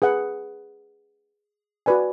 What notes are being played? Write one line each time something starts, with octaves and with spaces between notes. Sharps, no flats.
G#4 B4 F#5
F#4 B4 D5 G#5